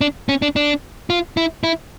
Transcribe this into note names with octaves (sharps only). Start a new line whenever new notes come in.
D4
C#4
D4
D4
F4
E4
E4